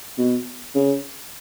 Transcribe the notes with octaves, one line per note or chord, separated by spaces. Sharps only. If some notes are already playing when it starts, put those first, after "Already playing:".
B2
C#3